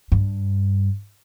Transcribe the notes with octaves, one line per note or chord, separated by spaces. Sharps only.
G2